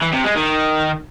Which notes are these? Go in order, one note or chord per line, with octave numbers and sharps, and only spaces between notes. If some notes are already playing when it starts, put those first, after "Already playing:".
E3
C3
G#3
D#3